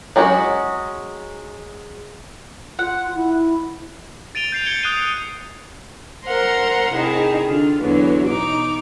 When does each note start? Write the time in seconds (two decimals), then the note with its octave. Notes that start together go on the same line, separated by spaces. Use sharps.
0.16 F#3 G#3 C#4 D4 F#4
2.79 F4 F#5
3.15 E4
4.35 A6 D7 D#7 F7 G7
4.52 G6 C7 F7
4.66 G#6 C#7 D#7 G7
4.83 D#6 F#6 C7 D#7 G7
6.25 A#4 C5 F#5 A#5 C6
6.93 C3 D#3 E4 G#4
7.47 D3 F4
7.81 E2 D3 E3 F#3
8.26 B2 D#4 D6